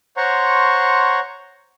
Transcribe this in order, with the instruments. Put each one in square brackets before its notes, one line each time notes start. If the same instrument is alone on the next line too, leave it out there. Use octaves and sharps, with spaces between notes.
[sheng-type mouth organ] C5 C#5 F#5 A#5 C6 C#6